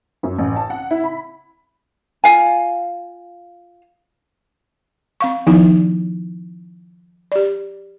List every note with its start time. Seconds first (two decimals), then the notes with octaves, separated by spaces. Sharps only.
0.23 F#2
0.38 A1
0.56 A5
0.70 F#5
0.91 E4
1.04 B5
2.24 F4 F5 G#5
5.21 C4 F5 C#6
5.47 D#3 F3 B3 D#4 E4
7.32 G4 D5